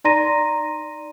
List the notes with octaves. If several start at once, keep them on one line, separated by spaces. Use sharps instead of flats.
D#4 D5 A#5 C6 A#6 D#7